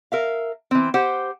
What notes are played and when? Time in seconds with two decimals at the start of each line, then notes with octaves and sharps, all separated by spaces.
0.12 A#4 E5 F5
0.71 E3 C4
0.94 G4 C5 F#5